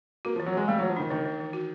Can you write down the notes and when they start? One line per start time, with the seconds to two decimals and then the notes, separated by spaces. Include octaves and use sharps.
0.25 A#3 F#4
0.36 F3
0.40 E3
0.46 F#3
0.53 E3 G#3
0.68 G3 A3
0.79 F#3
0.82 E3
0.90 F3
0.96 D#3 D4
1.11 D#3 E3
1.26 E3
1.40 E3
1.53 F#4